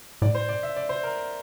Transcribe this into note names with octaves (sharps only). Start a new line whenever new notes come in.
A2 D5
C5
D5
E5
D5
C5
A#4